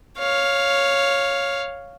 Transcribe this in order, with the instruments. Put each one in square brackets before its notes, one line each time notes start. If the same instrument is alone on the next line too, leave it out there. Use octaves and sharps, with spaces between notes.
[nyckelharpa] C#5 F5